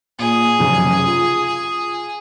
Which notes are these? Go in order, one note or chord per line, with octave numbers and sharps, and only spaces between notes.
A#2 G#4
F1 F#2 C#3
F4
G#4